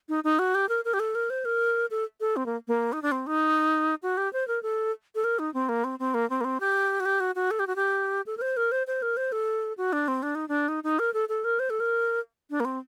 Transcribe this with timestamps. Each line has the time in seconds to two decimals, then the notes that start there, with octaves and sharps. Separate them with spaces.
0.09 D#4
0.24 D#4
0.39 F#4
0.55 G4
0.69 A#4
0.85 A#4
0.94 G4
1.00 A4
1.15 A#4
1.30 C5
1.45 A#4
1.91 A4
2.20 A4
2.36 C4
2.46 A#3
2.68 A#3
2.93 D#4
3.02 D4
3.12 C4
3.27 D#4
4.03 F#4
4.17 G4
4.33 C5
4.48 A#4
4.63 A4
5.15 A4
5.24 A#4
5.39 D#4
5.54 C4
5.69 A#3
5.84 C4
5.99 C4
6.14 A#3
6.30 C4
6.41 A#3
6.44 C4
6.60 G4
7.00 F#4
7.05 G4
7.20 F#4
7.35 F#4
7.51 A4
7.59 G4
7.67 F#4
7.76 G4
8.26 A4
8.37 A#4
8.42 C5
8.57 A#4
8.72 C5
8.87 C5
9.02 A#4
9.17 C5
9.32 A4
9.78 F#4
9.93 D4
10.08 C4
10.23 D4
10.35 D#4
10.49 D4
10.68 D#4
10.84 D#4
10.99 A#4
11.14 A4
11.29 A4
11.44 A#4
11.59 C5
11.70 A4
11.80 A#4
12.50 D4
12.60 A#3
12.65 C4